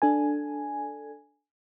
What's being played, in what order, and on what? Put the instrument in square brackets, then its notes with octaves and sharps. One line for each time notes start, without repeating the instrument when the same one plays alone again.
[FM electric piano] D4 A4 G#5